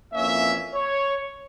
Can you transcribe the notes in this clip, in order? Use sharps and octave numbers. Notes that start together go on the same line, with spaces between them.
F2 E3 A#3 C#4 E5
C#5